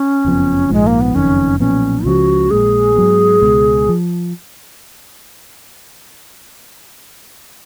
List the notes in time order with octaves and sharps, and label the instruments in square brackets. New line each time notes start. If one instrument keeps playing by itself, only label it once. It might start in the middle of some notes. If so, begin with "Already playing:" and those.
Already playing: [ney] C#4
[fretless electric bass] F#1 F2 F3 B3
[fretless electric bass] A#1 G#2 F3 [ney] G#3
[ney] A#3
B3
[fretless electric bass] F#1 F2 D#3 [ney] C#4
[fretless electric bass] B1 A#2 F3 B3 [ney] C#4
[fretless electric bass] C#2 C#3 F3 [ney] F#4
[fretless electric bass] A#1 A#2 G#3 [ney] G#4
[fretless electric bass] G#2 F#3 B3
C#2 B2 G#3
F3